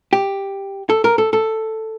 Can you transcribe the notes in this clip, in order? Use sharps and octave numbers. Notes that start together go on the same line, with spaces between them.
G4
A4
A#4
A4
A4